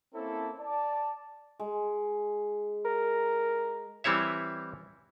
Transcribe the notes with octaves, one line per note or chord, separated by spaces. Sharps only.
A#3 C4 C#4 E4 A4
D5 A5
G#3
A#4
E3 G3 C4 E4 C#5 E5